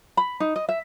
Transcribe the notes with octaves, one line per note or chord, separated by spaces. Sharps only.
B5
D#4
D#5
E5